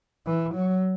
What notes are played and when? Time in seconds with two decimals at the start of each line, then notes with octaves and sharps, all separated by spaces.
0.26 E3
0.54 F#3